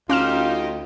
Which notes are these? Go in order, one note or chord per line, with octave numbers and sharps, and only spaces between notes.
D2 C#4 D#4 F4 G4 F6 E7